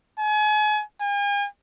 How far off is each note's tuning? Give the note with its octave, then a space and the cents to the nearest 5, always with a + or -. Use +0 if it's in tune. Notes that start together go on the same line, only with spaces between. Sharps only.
G#5 +35
G#5 -45